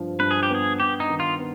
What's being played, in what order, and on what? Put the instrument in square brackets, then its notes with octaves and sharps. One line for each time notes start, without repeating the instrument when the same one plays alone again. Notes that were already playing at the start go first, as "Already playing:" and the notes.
Already playing: [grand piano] G2 F3
[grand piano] G2 [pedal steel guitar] B4
[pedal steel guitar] G#4
G4
[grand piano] B3 [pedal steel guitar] G#4
[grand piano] G2 [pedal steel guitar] G4
[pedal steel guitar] D#4
[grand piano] D#3
[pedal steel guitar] F4
[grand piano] B3